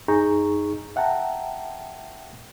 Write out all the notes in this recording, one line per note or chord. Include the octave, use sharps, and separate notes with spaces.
F#2 D#4 G#4 A#5 C#6 G6
E5 F#5 G5 A5 A#5